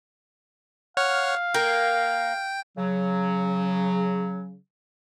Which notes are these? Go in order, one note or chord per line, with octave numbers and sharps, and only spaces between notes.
C#5 F5 F#5 F6
A#3 G5
C#3 F#3